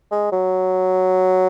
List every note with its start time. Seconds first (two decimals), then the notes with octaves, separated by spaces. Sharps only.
0.11 G#3
0.32 F#3